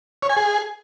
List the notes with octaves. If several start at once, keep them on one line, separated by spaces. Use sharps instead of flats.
C#5
G#5
G#4